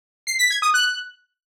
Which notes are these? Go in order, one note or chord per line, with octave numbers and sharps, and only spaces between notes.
C7
B6
G#6
D#6
F#6